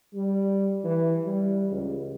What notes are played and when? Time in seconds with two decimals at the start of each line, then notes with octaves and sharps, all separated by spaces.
0.14 G3
0.84 E3
1.26 G3
1.71 C#2